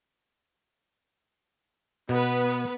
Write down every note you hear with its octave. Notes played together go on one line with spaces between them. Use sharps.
B2 B3 B4